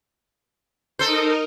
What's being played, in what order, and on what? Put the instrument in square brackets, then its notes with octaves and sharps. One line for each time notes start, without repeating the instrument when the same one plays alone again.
[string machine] D#4 A#4 D#5 [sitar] A4 C5